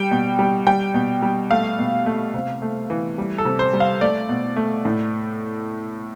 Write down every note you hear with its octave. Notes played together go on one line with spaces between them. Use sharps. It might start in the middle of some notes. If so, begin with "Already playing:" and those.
Already playing: G3 G5
B2
G3
G3 G5
B2
G3
A3 F5
B2
A3
C3
A3
E3
G3
A4
C3
C5
G3
F5
A3 D5
B2
A3
A2